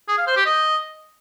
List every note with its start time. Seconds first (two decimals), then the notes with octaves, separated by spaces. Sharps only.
0.08 G#4
0.18 F5
0.27 C5
0.36 G4
0.46 D#5